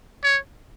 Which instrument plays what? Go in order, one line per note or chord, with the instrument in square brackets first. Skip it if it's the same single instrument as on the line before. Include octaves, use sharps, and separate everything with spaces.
[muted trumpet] C#5